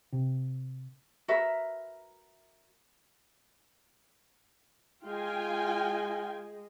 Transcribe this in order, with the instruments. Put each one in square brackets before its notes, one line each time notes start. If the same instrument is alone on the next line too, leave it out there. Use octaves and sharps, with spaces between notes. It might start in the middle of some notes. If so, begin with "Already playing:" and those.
[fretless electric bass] C3
[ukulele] F#4 A#4 B4 E5
[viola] G#3 [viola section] F4 G5 G#5